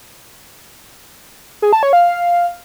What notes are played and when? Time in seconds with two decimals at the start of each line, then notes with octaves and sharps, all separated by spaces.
1.62 G#4
1.73 A5
1.83 C#5
1.93 F5